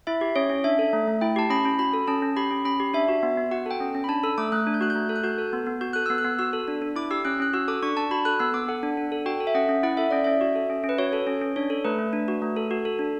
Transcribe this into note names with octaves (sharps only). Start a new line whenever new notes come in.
E4 E5
G4
C#4 C#5
C#4
D4 E5
A4
A3
A3
E4 G5
G4 A5
C#4 B5
C#4
F#4 B5
A4
C#4 A5
C#4
G4 B5
C#4
C#4 B5
G4
D4 E5
F#4
B3
B3
F#4 F#5
A4 G5
C#4
C#4
B5
D4 A5
A4 E6
A3 D6
A3 F#6
D4
G6
F#4 F#6
A3 G6
A4
F#6
F#4 G6
A4
B3
B3
F#4 G6
A4 F#6
B3 E6
F#6
B3
F#4 E6
A4
D4
D4
E4 D6
G4 E6
C#4 F#6
C#4 F#6
F#4 E6
A4 D6
D4 C#6
D4 A5
F#4 B5
A4 F#6
B3 E6
B3 D6
A4 F#5
D4
D4
A4
F#4 G5
A4
E5
C#4 F#5
C#4
E4 F#5
A4 E5
C#4 D5
C#4 E5
F#4
A4
C#4
C#4
B4
F#4 C#5
A4
C#4
C#4
D4 C#5
A4
A3 B4
A3
D4
F#4
A3
A4
F#4
A4
D4